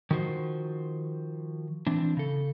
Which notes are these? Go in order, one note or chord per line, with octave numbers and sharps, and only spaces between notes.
D#3 F3 F#4 C5
E3 C4 D4
C#3 A4